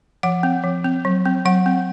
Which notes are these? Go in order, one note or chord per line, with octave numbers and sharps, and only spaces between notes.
F3 F#5
C4
F3
C4
F#3
C4
F#3 F#5
C4